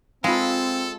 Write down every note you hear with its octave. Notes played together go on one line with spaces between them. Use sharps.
G#3 C4 F4 A4 F5